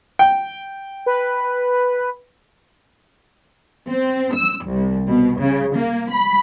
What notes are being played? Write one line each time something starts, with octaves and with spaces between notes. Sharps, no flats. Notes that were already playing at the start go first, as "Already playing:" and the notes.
G5
B4
C4
E6
C2
B2
C#3
A#3
B5